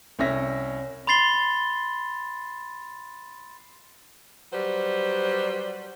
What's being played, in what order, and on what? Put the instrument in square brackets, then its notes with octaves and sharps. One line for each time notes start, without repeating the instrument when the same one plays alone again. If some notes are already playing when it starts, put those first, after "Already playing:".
[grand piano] C2 C#4 E5 A#6
[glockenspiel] B5 C6 A6 C7 G7
[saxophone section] F#3 G3 B4 C5